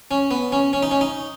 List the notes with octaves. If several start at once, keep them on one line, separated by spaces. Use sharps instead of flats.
C#4
B3
C#4
C#4
D#4
C#4
D#4